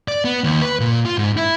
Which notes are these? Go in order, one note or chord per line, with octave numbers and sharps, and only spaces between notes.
D5
B3
D#2
B4
A#2
F4
G#2
E4